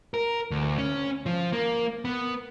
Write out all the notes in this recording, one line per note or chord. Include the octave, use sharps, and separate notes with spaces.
A#4
D2
C#4
F3
A#3
B3